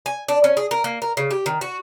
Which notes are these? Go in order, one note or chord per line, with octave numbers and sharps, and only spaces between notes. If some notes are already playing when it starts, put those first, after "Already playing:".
G#5
D4
C#4
G#4
A#4
A#3
A#4
C#3
G4
D#3
F#4